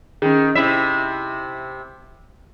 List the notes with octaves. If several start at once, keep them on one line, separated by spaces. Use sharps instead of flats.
D#3 C#4 G#4
C3 E4 E5